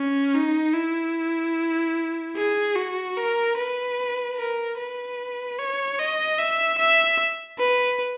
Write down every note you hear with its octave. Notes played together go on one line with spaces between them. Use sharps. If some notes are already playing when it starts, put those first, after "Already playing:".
Already playing: C#4
D#4
E4
G#4
F#4
A#4
B4
A#4
B4
C#5
D#5
E5
E5
B4